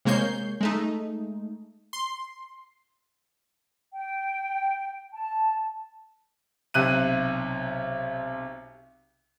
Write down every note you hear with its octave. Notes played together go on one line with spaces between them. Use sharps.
C3 G#3 A#3 C#5 G6 C7
G#3 A3 D#4
C6
G5
A5
B1 C3 F#6 D#7